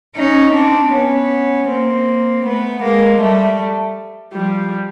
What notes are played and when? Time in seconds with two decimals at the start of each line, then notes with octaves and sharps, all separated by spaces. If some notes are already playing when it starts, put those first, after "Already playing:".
0.14 C#4 D#4
0.53 C4 D4
0.91 B3 C#4
1.67 A#3 C4
2.43 A3 B3
2.81 G#3 A#3
3.19 G3 A3
4.33 F3 G3